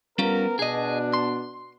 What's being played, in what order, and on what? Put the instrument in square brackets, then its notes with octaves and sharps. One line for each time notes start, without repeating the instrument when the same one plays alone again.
[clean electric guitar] G3 C#4 F4 [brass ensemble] B3 A#4
[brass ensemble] B2 D4 [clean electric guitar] G#4 D#5
[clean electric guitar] C6